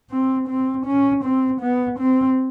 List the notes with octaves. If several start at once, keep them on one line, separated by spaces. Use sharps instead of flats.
C4
C4
C#4
C4
B3
C4